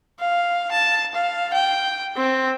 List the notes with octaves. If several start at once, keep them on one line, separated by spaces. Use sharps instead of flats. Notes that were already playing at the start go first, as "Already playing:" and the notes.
F5
A5
F5
G5
C4